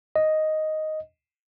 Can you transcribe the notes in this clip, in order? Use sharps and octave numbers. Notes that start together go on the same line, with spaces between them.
D#5